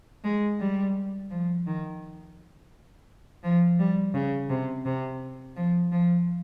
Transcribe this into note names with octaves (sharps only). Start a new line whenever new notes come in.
G#3
G3
F3
D#3
F3
G3
C#3
C3
C3
F3
F3